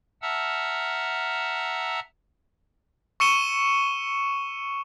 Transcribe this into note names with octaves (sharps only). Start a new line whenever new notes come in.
E5 F#5 A5 A#5 E6 F6
C#6 E6 C#7 D#7 E7 G7